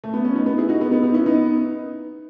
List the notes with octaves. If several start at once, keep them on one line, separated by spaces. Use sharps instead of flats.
A3
B3
C#4
B3 D#4
B3 D#4
E4 G#4
D#4 F#4
B3 D#4
B3 D#4
B3 D#4
C#4 E4
B3 D#4